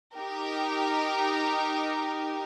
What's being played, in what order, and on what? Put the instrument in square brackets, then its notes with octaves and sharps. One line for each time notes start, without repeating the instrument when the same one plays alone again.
[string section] D#4 G4 A#4